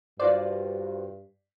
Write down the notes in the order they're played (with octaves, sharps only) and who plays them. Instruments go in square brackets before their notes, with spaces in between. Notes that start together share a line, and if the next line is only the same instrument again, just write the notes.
[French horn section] G2 [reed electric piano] F4 F#4 C5 [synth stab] D5